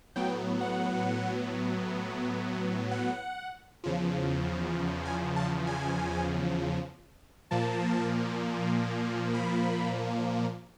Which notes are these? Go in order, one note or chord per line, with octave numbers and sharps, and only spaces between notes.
A2 F#3 B3 G5
F#5
F#5
E2 C#3 F3
G#5
A5
G#5
A#2 F3 A#3 A5
B5